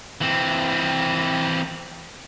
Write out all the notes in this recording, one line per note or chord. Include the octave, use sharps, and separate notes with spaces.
E3 C4